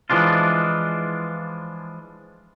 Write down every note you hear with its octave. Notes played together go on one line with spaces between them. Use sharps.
E3 F3 G#3 D4 F4